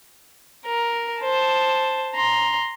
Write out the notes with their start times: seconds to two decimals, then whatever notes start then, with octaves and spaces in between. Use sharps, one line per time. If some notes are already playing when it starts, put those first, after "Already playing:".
0.66 A#4
1.21 C5 A5
2.15 A#5 C6